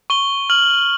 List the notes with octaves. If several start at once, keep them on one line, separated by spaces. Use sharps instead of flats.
C#6 G7
F6 F#7